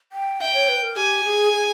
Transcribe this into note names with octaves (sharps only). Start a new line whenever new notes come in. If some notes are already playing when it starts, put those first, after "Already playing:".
G5
E5 G5
C#5
B4
A#4
G4 G#5
G#4
G#4